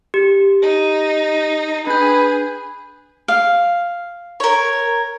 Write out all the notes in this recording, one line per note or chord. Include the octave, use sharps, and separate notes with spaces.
G4
D#4
D4 G#4 B4 G6
F5
A#4 C#5